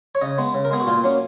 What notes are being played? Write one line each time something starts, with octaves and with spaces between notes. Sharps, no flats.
C#5
C#3 D#5
G#3 B3
C#3
A#4
G#3 B3 G#4
F#4
A#2 F4
F#3 A#3 C#4